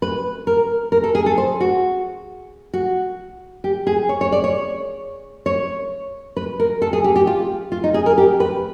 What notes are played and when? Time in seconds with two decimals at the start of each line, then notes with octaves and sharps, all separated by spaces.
0.02 B4
0.47 A#4
0.92 A#4
1.04 A4
1.15 G#4
1.26 A4
1.38 C5
1.60 F#4
2.74 F#4
3.64 G4
3.87 G#4
4.09 C#5
4.21 C#5
4.32 D5
4.44 C#5
5.46 C#5
6.37 B4
6.60 A#4
6.82 A4
6.93 G#4
7.04 G4
7.16 G4
7.27 F4
7.72 F4
7.84 D#4
7.94 G#4
8.06 A#4
8.18 G4
8.40 B4